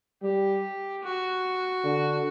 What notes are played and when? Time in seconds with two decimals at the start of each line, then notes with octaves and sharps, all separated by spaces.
0.22 G3 G4
1.03 F#4
1.84 D3